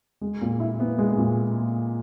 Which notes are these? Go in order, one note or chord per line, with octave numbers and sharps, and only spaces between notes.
G#3
A#2
E4
B3
G#3
A#2